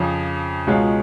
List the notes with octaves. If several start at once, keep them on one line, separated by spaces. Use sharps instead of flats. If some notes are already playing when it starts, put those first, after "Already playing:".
Already playing: F2 C#3 F3
C#2 B2 G#3 C#4 F4